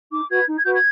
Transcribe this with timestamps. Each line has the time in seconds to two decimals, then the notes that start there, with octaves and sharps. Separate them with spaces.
0.11 D#4 D6
0.29 F#4 B4 G#6
0.47 D#4
0.55 G#6
0.64 F#4 B4 G6
0.72 G#6